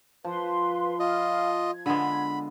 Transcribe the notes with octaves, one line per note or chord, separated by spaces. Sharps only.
F3 B4 F5 C6
F4 D#5 F5 B5 F6
G#6
D3 G#3 B3 B5